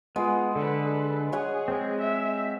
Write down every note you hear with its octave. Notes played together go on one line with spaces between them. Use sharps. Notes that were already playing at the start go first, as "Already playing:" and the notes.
G#3 B3 F4
D3 A4 B4
G#4 C#5 F#5 G#5
G#3 C4
E5